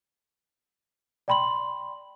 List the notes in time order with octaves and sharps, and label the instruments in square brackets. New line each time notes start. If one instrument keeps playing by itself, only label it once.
[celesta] D5 G5 B5 C6 F#7